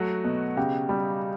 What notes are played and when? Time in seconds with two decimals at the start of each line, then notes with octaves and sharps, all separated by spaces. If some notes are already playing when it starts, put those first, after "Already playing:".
Already playing: F#3 A3 F#4
0.24 B2
0.57 C#3 G4
0.89 G3